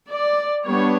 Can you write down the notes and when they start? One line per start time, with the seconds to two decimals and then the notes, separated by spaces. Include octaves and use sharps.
0.10 D5
0.65 G3 B3 D4 C#5